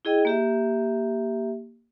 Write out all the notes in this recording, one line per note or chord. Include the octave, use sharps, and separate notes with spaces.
E4 G#4 D#5 G5
A#3 G4 E5